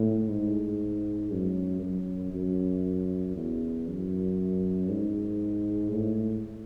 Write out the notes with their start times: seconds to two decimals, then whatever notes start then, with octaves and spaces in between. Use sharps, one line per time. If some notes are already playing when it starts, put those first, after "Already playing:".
Already playing: A2
0.29 G#2
1.31 F#2
1.82 F#2
2.34 F#2
3.36 E2
3.87 F#2
4.89 G#2
5.92 A2